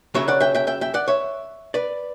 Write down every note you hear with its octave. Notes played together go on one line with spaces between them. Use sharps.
F#2 C#3 F#3 C#5 E5
D5 F#5
E5 G5
E5 G5
E5 G5
E5 G5
D5 F#5
C#5 E5
B4 D5